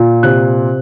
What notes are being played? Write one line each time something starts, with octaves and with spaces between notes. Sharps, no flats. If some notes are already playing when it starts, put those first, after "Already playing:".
Already playing: A#2
C3 F#6